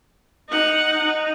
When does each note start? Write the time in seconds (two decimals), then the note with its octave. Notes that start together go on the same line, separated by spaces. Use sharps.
0.49 D#4 F#5
1.04 D#4